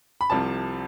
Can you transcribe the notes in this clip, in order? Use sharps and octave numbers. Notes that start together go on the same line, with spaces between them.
B5
C2 C3 F3 A5